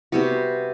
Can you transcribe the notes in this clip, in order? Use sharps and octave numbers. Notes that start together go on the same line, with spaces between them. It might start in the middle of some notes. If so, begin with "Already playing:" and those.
C3 G3 B3 F#4